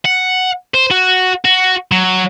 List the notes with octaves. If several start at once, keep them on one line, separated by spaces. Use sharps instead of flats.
F#5
C5
F#4
F#4
F#3